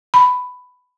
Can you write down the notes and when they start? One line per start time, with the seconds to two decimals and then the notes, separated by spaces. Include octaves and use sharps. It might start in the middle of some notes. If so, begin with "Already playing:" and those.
0.14 B5